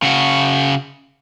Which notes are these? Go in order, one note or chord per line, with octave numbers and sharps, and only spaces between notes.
C#3 F#4